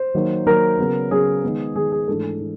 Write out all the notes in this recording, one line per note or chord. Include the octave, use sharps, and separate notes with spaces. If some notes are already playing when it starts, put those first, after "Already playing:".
Already playing: C5
D#3 F#3 A#3
D#3 F#3 A#3 A#4
C#3 F#3 B3
C#3 F#3 B3 G#4
D#3 G#3 B3
D#3 G#3 B3 G#4
G#4
G#2 E3 A3 D4 A4
E3